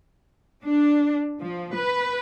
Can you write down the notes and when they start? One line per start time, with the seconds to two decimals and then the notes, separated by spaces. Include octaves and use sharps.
0.63 D4
1.41 F3
1.75 B4